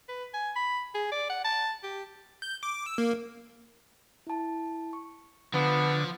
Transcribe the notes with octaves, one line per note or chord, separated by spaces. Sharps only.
B4
G#5
B5
G#4
D5
F#5
A5
G4
G6
D6
E6
A#3
E4 A5
C#6
D3 F3 B3